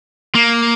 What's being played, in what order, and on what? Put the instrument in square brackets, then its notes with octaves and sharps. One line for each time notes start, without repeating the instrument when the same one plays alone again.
[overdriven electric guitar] A#3